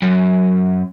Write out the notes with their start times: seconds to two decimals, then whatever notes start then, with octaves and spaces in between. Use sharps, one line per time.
0.02 F#2